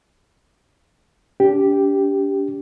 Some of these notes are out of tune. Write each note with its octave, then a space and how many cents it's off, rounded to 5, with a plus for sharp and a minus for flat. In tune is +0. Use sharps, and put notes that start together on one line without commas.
D4 -45 G4 +0